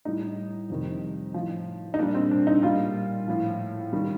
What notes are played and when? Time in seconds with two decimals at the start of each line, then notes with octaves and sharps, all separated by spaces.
0.05 A2 G3 D#4
0.70 F2 C3 D#3 G3
1.34 A2 F3
1.94 D#4
1.98 A#2 G3 D4
2.15 C4
2.31 D4
2.47 D#4
2.63 A#2 G3 F4
3.28 A2 F3
3.93 D#3 G3